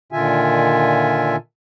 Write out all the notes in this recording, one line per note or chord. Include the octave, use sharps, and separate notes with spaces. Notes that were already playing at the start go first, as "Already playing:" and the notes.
A#2 D3 D#3 F4 E5 G#5